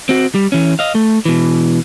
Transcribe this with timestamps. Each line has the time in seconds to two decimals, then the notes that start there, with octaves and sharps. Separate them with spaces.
0.09 C4 F#4
0.35 G3
0.52 E3 C#4
0.79 D#5 F5
0.95 A3
1.25 B2 E3